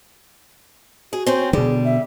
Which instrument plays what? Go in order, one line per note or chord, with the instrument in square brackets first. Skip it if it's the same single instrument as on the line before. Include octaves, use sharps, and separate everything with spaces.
[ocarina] F#4 [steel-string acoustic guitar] G#4
[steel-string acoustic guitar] C4 C#4 C5
[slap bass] B2 D3 [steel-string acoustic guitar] G3 [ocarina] G#4
[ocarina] E5